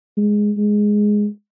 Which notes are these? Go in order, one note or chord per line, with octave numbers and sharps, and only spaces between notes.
G#3
G#3